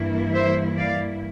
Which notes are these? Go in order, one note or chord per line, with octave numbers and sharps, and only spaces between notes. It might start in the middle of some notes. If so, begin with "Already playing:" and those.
Already playing: G2 E3 A#3 E4
C5 E5
D5 F5